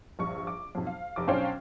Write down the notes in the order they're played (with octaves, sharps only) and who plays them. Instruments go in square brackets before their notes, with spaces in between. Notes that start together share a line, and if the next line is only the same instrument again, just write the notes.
[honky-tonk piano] A#1 G2 C#6
D6
B1 F2
F5
F1 D6
B1 C#4 D4 C5 F5 G5